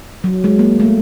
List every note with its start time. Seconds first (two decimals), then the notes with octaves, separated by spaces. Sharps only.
0.24 F#3
0.44 G#3
0.59 A#3
0.80 A3